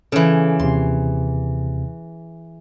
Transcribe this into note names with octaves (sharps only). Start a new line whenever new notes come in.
C#3 E3 A4
D#2 C3 C6